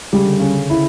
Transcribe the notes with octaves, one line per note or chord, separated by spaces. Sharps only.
C#3 G3
D3
C#3 C#4
E4